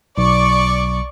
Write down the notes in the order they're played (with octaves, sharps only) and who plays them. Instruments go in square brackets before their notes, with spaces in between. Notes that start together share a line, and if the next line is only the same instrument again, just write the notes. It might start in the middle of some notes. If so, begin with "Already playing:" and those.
[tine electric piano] B1 [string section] D5 C#6